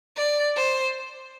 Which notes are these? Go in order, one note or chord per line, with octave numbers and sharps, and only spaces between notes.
D5
C5